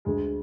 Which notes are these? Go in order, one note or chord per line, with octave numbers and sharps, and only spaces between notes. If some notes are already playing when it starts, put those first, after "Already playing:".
D2 G#3